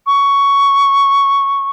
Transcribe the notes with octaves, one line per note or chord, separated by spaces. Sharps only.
C#6